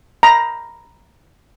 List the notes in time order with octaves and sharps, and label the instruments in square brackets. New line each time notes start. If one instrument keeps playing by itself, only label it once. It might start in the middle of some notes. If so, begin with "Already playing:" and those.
[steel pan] A#5 B5